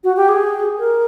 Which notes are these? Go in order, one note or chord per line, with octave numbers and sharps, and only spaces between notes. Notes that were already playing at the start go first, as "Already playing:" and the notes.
F#4
G4
G#4
A#4